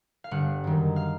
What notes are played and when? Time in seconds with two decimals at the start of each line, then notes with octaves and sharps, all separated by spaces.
0.24 F5
0.31 G1 F#5
0.64 F#2 D#3
0.96 F5